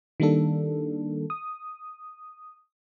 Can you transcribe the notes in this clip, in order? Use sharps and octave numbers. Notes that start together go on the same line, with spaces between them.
D#3 G3 A#3 D4 A4
D#6